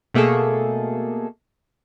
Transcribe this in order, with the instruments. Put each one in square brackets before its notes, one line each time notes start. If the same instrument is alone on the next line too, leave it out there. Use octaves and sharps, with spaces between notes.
[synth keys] B2 A3 A#3 G#4 A4